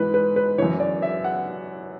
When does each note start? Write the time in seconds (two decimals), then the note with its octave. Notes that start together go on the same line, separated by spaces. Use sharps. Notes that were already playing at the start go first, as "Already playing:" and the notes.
Already playing: G#2 E3 B4
0.14 B4
0.36 B4
0.58 F#2 E3 C#5
0.80 D5
1.02 E5
1.24 F#5